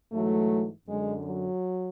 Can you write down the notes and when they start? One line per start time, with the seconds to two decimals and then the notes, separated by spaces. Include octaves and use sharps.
0.12 G#2 E3 F#3 A3
0.87 F#2 D3 G#3
1.25 F#3